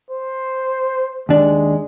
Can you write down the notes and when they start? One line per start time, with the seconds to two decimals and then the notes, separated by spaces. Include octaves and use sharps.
0.10 C5
1.29 D#2 G#3 D4